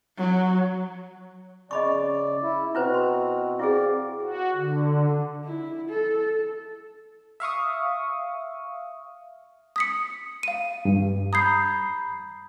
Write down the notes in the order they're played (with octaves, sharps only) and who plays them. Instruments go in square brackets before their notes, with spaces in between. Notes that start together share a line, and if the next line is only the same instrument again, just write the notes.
[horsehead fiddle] F#3
[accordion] C#3 D5 [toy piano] D#5 B5 C#6
[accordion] E4
[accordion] B2 C4 F#4 [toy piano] E4 B4 C5
[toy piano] C6
[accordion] C4 D5 F5 [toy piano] E4 G#4
[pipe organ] F#4
D3
[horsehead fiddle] E4
A4
[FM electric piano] E5 F5 C#6 D#6
[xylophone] D#6 B6 C#7
F5 D#7
[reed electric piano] G2
[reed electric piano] A#5 B5 G6 [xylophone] D#6 G#6 C7